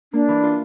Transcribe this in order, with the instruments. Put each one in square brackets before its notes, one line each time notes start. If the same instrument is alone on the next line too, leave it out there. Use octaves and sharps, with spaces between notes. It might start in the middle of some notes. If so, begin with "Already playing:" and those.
[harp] A#3 [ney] D4
[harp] E3
F4